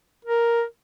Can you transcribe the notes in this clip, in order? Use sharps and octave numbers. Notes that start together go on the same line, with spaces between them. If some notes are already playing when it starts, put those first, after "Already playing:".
A#4